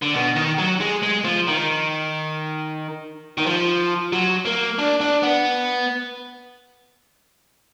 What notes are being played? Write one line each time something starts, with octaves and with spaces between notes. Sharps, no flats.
D3
B2
D#3
F#3
G#3
G#3
F3
D#3
D#3
F3
F#3
A#3
D4
D4
B3